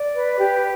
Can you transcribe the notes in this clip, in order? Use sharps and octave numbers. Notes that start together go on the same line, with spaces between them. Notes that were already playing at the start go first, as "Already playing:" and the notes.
Already playing: D5
B4
G4